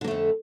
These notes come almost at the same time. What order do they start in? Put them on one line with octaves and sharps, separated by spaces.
D3 A#3 A3 F2